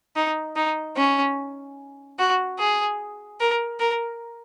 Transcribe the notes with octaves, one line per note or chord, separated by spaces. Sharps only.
D#4
D#4
C#4
F#4
G#4
A#4
A#4